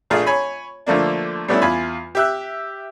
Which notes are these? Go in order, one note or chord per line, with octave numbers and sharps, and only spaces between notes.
A#1 A3 D4 F4 G#4
C#5 G#5 B5
D3 F3 A3 A#3 D4
G3 A3 B3 C#4 D4 E4
E2 F4 G#5 B5
G4 E5 F#6